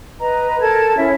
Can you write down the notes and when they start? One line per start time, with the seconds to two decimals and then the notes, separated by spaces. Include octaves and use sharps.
0.19 B4 D#5 A#5
0.60 A4 A#4 A5 G#6
0.96 C#4 E4 C#5 E5